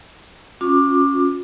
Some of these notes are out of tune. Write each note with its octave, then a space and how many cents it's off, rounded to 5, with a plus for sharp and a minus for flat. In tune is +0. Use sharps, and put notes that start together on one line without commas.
C#4 +0 F4 +45 D6 +15